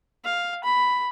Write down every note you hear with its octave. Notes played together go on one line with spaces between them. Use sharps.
F5
B5